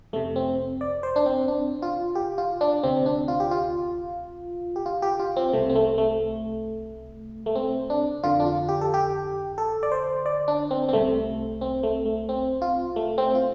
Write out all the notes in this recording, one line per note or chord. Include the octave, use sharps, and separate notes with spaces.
F2 C3 A3
C4
D5
C5
D4
C4
D4
F4
G4
F4
D4
D2 C3 C4
D4
F4
G4
F4
G4
F4
G4
F4
C4
C2 C3 A3
C4
A3
A3
A3
C4
D4
F2 D3 F4
D4
F4
G4
A4
G4
A4
D5
C5
D5
D4
C4
C4
C2 C3 A3
C4
A3
A3
C4
F4
A3
C4
F4